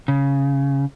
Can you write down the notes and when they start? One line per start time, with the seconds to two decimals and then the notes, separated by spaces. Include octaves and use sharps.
0.08 C#3